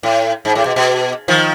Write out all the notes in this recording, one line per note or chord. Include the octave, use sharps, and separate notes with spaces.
A2
G#2
A2
B2
B2
D#3 F3